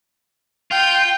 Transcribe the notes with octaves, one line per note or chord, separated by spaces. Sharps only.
F4 G5